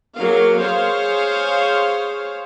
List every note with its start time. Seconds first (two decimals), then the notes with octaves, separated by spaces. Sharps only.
0.18 F#3 A#3 G#4 F5
0.61 G#4 C5 C#5 F5